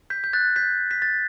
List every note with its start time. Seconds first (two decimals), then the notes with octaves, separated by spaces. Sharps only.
0.10 G6 B6
0.24 G6
0.33 F#6 A6
0.56 G6 B6
0.91 B6
1.02 A6